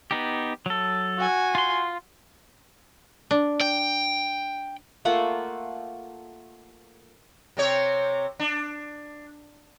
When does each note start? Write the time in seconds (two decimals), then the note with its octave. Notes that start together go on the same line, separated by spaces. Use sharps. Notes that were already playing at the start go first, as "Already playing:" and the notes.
0.11 B3 D#4 G4
0.66 F#3 A4
1.18 F#4 G#5
1.55 F4 C6
3.31 D4
3.61 G5
5.05 A3 A#3 F4 F#5
7.57 C3 C4 C#5
8.39 D4